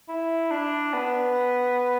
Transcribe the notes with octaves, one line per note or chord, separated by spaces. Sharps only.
E4
D4
B3